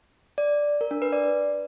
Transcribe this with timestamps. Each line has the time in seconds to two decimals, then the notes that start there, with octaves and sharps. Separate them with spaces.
0.38 D5
0.81 A#4
0.91 D4
1.02 B4
1.13 D5